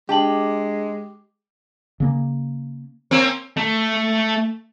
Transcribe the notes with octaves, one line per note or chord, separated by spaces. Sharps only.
G#3 D4 G4 A5 F#7
C#3 A#3
A#3 C4 C#4
A3